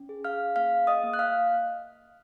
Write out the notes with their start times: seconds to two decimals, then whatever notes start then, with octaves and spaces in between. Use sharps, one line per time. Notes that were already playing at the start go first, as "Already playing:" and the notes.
Already playing: C#4
0.09 G#4
0.24 F5 F6
0.56 A#3 F5 F6
0.87 D#5 D#6
1.03 A#3
1.14 F#6
1.19 F5 F6